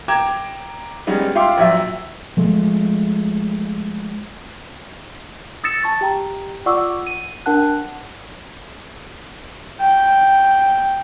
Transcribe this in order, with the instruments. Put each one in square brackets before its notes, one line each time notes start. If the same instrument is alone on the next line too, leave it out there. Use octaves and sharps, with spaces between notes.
[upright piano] G5 A#5 D6 G#6 E7
G3 G#3 B3 C#4 D#4 G#4
F4 E5 F5 G5 C6 D6
A#1 F2 F#3 E5
[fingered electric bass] F3 G#3 A3
[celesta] D#6 E6 A6 A#6 C#7 E7
A5 C#6 A6
G4 G5 A#5
F4 D5 F#5 C#6 D6 E6
D#7
D4 A#4 F#5 A5 F#6
[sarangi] G5